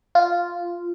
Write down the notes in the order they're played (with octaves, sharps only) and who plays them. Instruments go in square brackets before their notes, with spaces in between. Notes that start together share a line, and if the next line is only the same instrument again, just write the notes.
[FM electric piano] F4